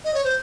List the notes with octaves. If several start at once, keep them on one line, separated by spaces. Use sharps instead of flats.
D#5
C#5
C5